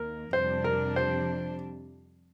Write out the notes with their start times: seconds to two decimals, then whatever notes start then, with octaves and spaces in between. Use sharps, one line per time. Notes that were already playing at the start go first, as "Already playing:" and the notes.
Already playing: D#2 D#3 A#3 A#4
0.32 F2 C3 G3 D4 C5
0.64 A#4
0.96 C5